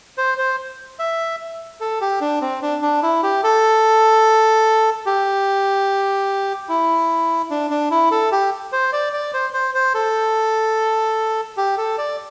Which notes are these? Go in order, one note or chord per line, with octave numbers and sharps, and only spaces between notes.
C5
C5
E5
A4
G4
D4
C4
D4
D4
E4
G4
A4
G4
E4
D4
D4
E4
A4
G4
C5
D5
D5
C5
C5
C5
A4
G4
A4
D5